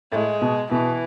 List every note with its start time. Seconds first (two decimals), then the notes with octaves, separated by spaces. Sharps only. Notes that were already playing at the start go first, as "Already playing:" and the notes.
0.12 A2 G#3
0.41 B2
0.71 B2 E3